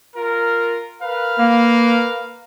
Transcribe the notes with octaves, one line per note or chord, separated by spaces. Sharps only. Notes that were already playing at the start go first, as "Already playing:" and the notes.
F4 A#4
A#4 B4 F5
A#3